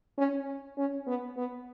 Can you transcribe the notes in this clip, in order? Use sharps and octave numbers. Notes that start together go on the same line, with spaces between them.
C#4
C#4
B3
B3